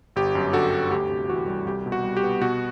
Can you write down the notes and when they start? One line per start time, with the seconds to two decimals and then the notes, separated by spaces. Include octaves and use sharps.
0.16 G1 G4
0.35 F#2
0.53 D3 F#4 A4
0.72 G1
0.91 D2 G4
1.10 C3
1.28 E3 F#4
1.47 G3
1.66 C2 G4
1.86 B2
1.92 F#4
2.03 G3
2.17 G4
2.23 B3
2.41 B2 F#4